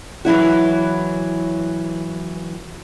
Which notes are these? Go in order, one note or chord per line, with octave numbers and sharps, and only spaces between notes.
E3 F#3 E4 F#4